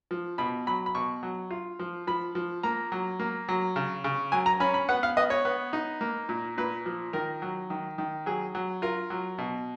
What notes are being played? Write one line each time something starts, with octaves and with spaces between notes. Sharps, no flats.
F3
B2 B5
F#3 B5
B5
B2 C#6
F#3
F4
F3
F3 B5
F3
A#3 A#5
F#3
A#3
F#3
C#3
C#3
F#3 G#5
A#5
C#4 B5
B5
B3 F#5
F5
B3 D#5
C#5
B3
D#4
A#3
A#2
A#2 B4
F3
D#3 A#4
F#3
D#3
D#3
F#3 G#4
F#3
F4 A#4
F#3
B2